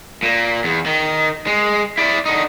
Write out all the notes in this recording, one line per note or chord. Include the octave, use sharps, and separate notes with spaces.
A#2 A#3
E2
D#3
G#3
E4 D5
D3 D#4